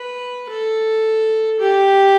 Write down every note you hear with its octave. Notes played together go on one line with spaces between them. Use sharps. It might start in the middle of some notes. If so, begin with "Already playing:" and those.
Already playing: B4
A4
G4